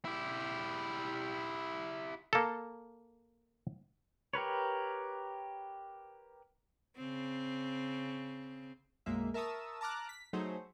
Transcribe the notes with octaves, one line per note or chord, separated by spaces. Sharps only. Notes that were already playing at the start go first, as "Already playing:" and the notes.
E4 G4
A#3 A4
G4 A#4 B4 C#5
C#3 C4
B1 F#2 G#3 A#3 E5
A#4 E5 A5 C#6 D#6 E6
A5 A#5 D6 F6 F#6
B6
F#3 A3 D#4 G#4 C5 C#5